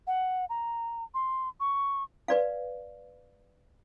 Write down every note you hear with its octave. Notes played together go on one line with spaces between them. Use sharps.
F#5
A#5
C6
C#6
B4 D5 F5